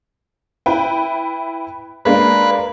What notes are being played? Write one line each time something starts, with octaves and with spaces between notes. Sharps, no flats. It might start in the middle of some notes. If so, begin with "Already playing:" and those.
E4 B4 G5
G#3 A#3 D4 B4